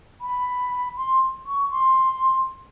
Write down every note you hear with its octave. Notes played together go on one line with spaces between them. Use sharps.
B5
C6
C#6
C6